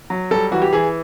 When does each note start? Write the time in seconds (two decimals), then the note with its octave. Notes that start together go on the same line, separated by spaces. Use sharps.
0.10 F#3
0.31 G3 A4
0.51 E3 F#4
0.62 G4
0.73 E3 G#4